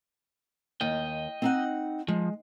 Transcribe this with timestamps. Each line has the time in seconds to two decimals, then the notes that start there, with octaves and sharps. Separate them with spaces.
0.81 D#2 D#5 G5
1.42 C4 D#4 F#5
2.08 F3 G#3